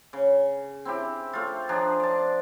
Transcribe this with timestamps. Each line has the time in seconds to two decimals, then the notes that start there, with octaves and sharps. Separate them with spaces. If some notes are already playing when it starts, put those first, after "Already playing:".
0.13 C#3
0.85 C4 E4 G4
1.33 A3 F4
1.69 F3 D4 G#4 A#5
2.00 D5 A5